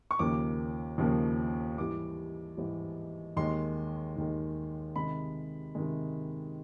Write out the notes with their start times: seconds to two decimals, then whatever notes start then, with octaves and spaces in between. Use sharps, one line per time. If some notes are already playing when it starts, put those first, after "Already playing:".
0.11 C#6
0.19 D#2 C#3 F3 A#3 D6
0.98 D#2 C#3 F3 A#3
1.78 G#2 E3 G3 D6
2.57 G#2 E3 G3
3.37 D#2 D#3 G#3 C6
4.17 D#2 D#3 G#3
4.96 C3 D#3 G#3 B5
5.75 C3 D#3 G#3